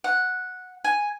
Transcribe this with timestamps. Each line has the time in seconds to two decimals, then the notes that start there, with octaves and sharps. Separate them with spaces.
0.04 F#5
0.84 G#5